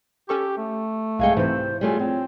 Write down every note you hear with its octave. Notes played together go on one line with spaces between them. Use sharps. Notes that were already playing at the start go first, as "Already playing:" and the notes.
C#4 G4 A4 C#6
A3
C2 G2 G#3 F5 G5 G#6 C#7
G#2 C3 E3 E4 C5
G3 A3 F4 G#4 C#5
F3 C4